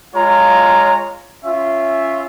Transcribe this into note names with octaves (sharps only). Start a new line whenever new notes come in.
G#3 F4 C#5 F5 A#5
C#4 F4 E5